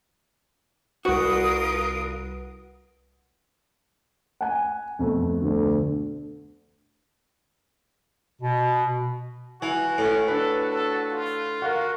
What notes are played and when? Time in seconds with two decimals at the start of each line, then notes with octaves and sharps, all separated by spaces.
1.05 C2 F4 F#4 A#4 B4 D#6
4.41 F#5 G#5
4.99 F2 B2 A3
5.41 D2
8.42 B2
9.62 E3 F#4 G#5
9.98 A2 C#4
10.28 D4 F#4 A4 B4
10.71 A4
11.10 F4
11.62 F#4 A#4 F5 F#5